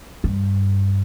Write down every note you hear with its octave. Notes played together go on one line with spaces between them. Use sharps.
G2